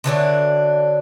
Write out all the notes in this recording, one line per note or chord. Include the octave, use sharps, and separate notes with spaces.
D3 E3 F#3 D4